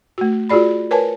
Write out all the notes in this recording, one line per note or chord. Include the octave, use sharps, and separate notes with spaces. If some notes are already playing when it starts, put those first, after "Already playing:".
A3 F#4
F4 F#4 G#4 D5 B5
A#4 B4 C#5 G#5 A5